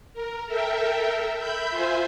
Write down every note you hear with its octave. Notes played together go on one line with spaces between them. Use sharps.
A#4
A4 A#4 E5 G5
E5 B5 G6
F4 C5 E5 G#5